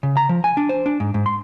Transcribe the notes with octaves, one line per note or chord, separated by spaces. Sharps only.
C#3
A#5
F3
G#5
D4
C5
D4
G#2
G#2
C6